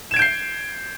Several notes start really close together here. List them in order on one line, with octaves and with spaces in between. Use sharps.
E7 G#6 D7 G6 C7